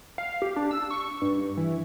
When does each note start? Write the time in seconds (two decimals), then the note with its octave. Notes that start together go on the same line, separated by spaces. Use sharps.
0.18 F5
0.42 G4
0.56 D4
0.71 E6
0.91 C#6
1.22 G2
1.57 E3